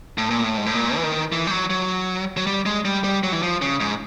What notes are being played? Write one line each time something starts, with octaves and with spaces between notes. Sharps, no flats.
A2
A#2
A2
G#2
A2
A#2
E3
D#3
E3
G3
F#3
F#3
F#3
G3
G#3
G3
G3
F#3
E3
F3
C#3
G#2